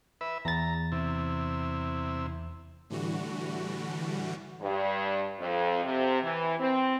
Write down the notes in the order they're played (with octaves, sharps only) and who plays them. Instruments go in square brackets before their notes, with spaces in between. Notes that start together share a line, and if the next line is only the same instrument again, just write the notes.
[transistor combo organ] B4 E5
[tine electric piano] E2 A6 [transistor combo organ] A#5
[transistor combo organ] C3 E4
[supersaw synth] A2 D3 E3 G3 F#4
[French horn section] G2
F2
C3
E3
C4